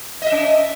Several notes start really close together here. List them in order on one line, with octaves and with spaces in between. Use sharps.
D#5 E5 C#4